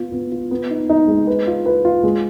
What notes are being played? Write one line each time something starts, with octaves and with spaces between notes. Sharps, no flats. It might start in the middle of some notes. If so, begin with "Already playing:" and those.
Already playing: B3 F4
B3
F4
B3
D#4
D#4
G#3
B4
F4
B4
F4
G#3